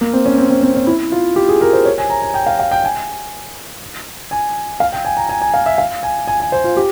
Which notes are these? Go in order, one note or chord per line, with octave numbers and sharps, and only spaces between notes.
A#3
C4
C#4
C4
C4
C4
C#4
E4
F4
G4
G#4
A#4
C5
C#5
G#5
A#5
G#5
G5
F5
F5
G5
G#5
G#5
F5
G5
G#5
A#5
G#5
G#5
F5
E5
F5
G#5
G#5
G#5
C5
F4
G4